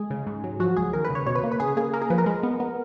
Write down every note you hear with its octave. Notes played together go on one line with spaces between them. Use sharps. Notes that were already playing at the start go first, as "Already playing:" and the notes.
Already playing: G#3 G#4
C#3
G#2
F#3
F3 F#4
C#2 G#4
D#2 A#4
B4
C#3
C#5
B2 C#5
B4
A#3
B4
C#3 G#4
A#3 G#4
A#3 A#4
G#4
F3 B4
A#4
G#3
B3
B3